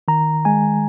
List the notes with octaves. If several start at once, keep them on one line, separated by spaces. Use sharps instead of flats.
D#3 A#5
G#3 G#5